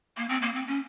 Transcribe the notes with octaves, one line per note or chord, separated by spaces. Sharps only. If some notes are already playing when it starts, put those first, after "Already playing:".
A#3
C4
A#3
C4
C#4